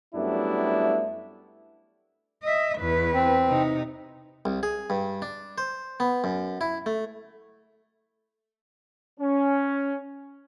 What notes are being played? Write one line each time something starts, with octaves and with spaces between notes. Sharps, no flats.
F#2 G3 A3 B3 D4 E4
D#5 E5
E2 B4
C4
C3 D#4
C2
G#4
G2
D4
C5
B3
F#2
E4
A3
C#4